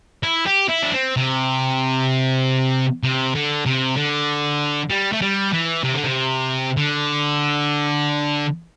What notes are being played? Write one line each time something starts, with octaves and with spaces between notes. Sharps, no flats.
E4
G4
E4
D4
C4
C3
C3
D3
C3
D3
G3
A3
G3
E3
C3
D3
C3
D3